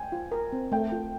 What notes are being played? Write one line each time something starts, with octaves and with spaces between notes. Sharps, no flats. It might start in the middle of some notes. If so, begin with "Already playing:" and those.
Already playing: G5 G#5
F4
A#4
C4
A3 G5
F4